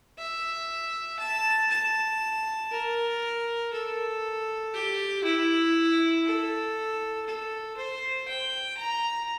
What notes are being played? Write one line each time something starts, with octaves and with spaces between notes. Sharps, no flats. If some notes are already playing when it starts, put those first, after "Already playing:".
E5
A5
A5
A#4
A4
G4
E4
A4
A4
C5
G5
A#5